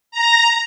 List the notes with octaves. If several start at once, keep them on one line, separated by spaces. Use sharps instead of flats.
A#5